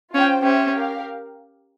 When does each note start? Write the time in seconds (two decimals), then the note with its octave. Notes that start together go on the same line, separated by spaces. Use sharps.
0.14 C#4 F4 C5 G5
0.43 C#4 G4 C5 E5 G5
0.72 G4 A#4 F5